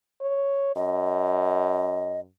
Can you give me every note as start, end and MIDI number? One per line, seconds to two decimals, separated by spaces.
0.21 0.72 73
0.76 2.27 42
0.76 2.20 75